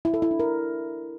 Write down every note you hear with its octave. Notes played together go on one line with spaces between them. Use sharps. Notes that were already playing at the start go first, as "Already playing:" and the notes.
E4
A4
E4
D4
A#4